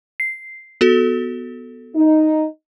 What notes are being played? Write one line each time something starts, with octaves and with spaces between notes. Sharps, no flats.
C7
B3 F#4 A4
D#4